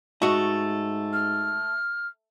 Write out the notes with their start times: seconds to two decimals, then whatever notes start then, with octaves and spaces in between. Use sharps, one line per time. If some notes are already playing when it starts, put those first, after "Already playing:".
0.22 G#2 A3 F#4 D#5
1.13 F6